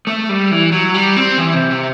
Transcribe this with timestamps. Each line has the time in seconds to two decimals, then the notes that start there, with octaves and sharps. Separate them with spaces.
0.07 A3
0.29 G3
0.51 E3
0.72 F#3
0.94 G3
1.16 C4
1.38 E3
1.54 C3
1.70 C3